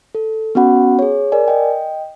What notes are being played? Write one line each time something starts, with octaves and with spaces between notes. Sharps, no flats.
A4
B3 C#4 F#4 F#5 B5
G#4 C#5
A#4 D5 G#5
D#5 G5